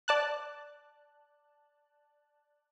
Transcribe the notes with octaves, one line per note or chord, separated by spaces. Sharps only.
D5 A5 F#6